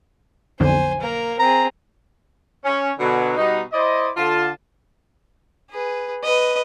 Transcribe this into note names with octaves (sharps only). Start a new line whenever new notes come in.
B1 F2 D3 C5 G#5
A#3 A#4
C4 G#4 A#5
C#4
B2 D3 F#3
B2 G3 B3 D#4
E4 C5 D5 D#5
D3 F4 A5
G#4 B4
B4 D#5